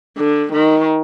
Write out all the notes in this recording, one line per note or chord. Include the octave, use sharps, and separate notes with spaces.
D3
D#3